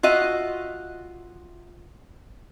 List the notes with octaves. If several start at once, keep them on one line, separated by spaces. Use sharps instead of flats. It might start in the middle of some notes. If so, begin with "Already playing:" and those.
F4 F#4 D#5 E5